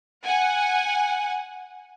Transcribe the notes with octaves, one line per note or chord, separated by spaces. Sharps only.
F#5 G#5